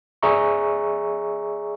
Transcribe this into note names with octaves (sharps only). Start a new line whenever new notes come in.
G#4 D5 E5 A#5 C#6